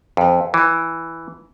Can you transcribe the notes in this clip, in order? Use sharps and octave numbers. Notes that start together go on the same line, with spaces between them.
F2
E3